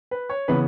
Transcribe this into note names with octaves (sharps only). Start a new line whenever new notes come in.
B4
C#5
C#3 E3 B3 B4